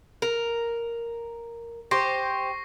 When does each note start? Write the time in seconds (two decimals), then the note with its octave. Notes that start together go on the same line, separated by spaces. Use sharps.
0.22 A#4
1.91 G4 C5 C#6 A#6 C7